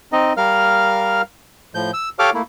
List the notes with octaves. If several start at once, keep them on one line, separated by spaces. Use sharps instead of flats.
C4 D#4 D#5
G3 A#4 F5 F6
A2 F3 G6
E6
G4 A4 C#5 F5 D6 F6
A3 A#3 E4